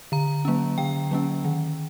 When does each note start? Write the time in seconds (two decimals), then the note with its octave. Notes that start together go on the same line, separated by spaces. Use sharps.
0.12 D3 A#5
0.45 F#3 A#3 C#4
0.78 D3 G5
1.11 F#3 A#3 C#4
1.45 D#3